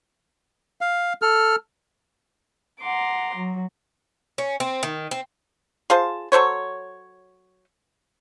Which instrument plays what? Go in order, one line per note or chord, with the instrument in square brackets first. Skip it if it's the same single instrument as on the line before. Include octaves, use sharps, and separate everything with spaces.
[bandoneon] F5
A4 F6
[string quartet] F#5 A#5 C6 D6
F#3
[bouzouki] C#4
C4
D#3
C4
[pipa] F4 G#4 C5 A5
F#3 A4 C5 C#5